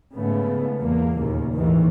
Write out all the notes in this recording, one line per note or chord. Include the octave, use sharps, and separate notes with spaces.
G#2 C#3 A3 B3
E2 A#3
D#2 A#2 C#3
A1 D#2 G#2 D#3 E3